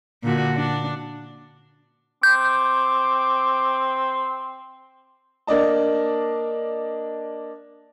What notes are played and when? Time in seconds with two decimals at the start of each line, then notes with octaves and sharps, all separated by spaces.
0.23 A#2 D3 F#4
0.56 D4
2.23 C4 D6 G6
5.47 A#3 D4 D5 D#5 A5